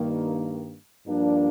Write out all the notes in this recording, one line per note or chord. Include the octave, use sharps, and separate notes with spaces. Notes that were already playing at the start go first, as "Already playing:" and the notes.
Already playing: G2 D#3 A#3
G2 F3 A#3 D4